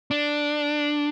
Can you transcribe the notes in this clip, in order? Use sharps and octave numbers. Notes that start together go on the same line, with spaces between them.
D4